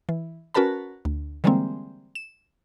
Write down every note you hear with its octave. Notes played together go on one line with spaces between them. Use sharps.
E3
C#4 F#4 A#4 B4 A5 B5
D2
D3 E3 G3 G#3 A#3 C4
E7